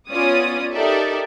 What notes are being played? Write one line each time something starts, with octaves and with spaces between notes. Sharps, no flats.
B3 C#4 F4 D5 D#6
D#4 G4 A4 A#4 D5 E5